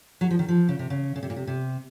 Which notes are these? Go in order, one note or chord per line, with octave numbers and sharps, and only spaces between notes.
F#3
F3
D#3
F3
C#3
C3
C#3
C#3
C3
A#2
C3
C3